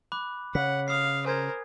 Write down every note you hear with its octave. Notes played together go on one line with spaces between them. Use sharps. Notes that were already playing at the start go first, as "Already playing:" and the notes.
B5 D6 F#6
C#3 F#5 B6
F5 D#6 C7
A#4 C5 G#5 G#6